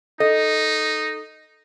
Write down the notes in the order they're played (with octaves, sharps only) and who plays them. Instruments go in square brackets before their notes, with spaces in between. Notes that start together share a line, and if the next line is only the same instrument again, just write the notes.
[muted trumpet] D#4 [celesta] A4 [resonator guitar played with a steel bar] D#5